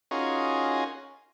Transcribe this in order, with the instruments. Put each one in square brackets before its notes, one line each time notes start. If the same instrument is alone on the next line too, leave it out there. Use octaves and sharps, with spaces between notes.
[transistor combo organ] C#4 D#4 F4 F#4 G#4 A#4